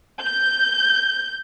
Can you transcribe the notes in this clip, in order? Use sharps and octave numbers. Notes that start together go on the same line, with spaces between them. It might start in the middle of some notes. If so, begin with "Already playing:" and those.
G6